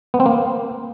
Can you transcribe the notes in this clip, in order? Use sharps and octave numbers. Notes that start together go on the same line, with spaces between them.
B3
C4
A#3